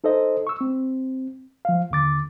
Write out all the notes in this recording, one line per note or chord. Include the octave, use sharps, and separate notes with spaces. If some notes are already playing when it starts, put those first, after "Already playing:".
D#4 A4 C5 D#5
C#6 E6
C4
F3 F5
D#2 D3 D6 A6